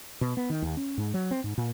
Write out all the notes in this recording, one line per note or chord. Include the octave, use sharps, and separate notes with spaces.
B2
B3
D#3
D#2
C#4
G#2
F#3
C4
G#2
A#2